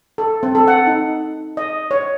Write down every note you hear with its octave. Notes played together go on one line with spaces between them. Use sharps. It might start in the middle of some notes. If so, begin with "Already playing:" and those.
A4
C4
A4
F#5
D#4
D#5
C#5